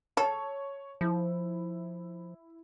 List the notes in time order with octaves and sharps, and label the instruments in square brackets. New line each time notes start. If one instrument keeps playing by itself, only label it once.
[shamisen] A4 [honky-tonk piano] C#5
[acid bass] F3 [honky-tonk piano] E4